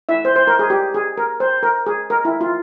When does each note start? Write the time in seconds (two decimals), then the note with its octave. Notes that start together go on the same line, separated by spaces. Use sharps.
0.09 E4 E5
0.25 C5
0.36 C5
0.47 A#4
0.59 G#4
0.70 G4
0.94 G#4
1.17 A#4
1.40 C5
1.63 A#4
1.86 G#4
2.10 A#4
2.25 E4
2.41 F4